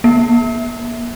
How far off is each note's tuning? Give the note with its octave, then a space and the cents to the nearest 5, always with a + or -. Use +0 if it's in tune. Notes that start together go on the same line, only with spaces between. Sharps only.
A#3 +35